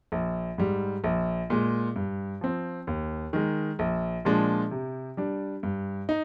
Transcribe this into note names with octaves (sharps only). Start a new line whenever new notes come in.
A#1
G#2 G3
A#1
A#2 G#3
G2
F3 C4
D#2
D#3 G#3
A#1
A#2 F3 G#3 D4
C3
G3 D4
G2
D#4